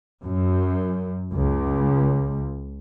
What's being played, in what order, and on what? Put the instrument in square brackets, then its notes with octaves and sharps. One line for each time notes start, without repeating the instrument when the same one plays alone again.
[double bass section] F#2
C#2